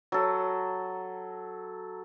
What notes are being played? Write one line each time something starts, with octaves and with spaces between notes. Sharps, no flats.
F#3 A4